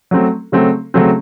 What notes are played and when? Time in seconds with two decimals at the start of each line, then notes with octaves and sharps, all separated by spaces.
0.11 F#3 A3 C4
0.52 C#3 F#3 A3 C4
0.94 C#3 F#3 A3 C4